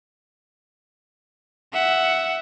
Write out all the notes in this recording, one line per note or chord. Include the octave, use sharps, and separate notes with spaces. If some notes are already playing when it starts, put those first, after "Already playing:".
E5 F#5